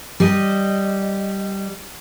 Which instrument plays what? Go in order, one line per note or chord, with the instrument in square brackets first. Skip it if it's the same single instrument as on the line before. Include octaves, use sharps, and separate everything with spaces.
[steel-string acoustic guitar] G3 D#5